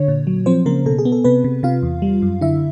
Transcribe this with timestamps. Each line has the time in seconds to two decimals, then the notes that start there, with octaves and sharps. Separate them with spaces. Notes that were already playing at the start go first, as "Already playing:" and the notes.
Already playing: D3 C#5
0.08 A#2
0.27 F#3
0.46 F3 C4 C5
0.66 C#3 A#3 A#4
0.86 B2 A4
0.98 G#4
1.05 B3
1.12 A4
1.24 C3 B3 B4
1.44 C3
1.63 C3 F4 F5
1.83 E2
2.02 G3
2.22 F#2
2.41 D3 E4 E5